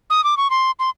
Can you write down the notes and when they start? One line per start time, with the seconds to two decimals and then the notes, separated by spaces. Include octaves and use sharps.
0.10 D#6
0.24 D6
0.37 C#6
0.50 C6
0.79 C6